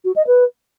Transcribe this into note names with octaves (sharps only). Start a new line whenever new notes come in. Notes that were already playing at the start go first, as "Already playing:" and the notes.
F#4
D#5
B4